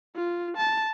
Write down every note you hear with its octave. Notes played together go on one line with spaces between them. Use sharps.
F4
A5